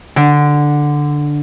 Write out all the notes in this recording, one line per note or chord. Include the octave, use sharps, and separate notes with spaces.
D3